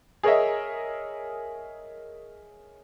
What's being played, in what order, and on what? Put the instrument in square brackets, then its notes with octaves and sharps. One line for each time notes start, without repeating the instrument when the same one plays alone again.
[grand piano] G#4 A#4 C#5 D#5 E5